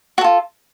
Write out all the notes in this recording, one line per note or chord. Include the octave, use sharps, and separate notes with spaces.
F4 F#4 A4